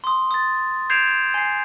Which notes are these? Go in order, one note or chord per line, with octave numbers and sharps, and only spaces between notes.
C6 D#6
D#6 A6
G6 G#6 C7 D7 E7 F7
G#5 C7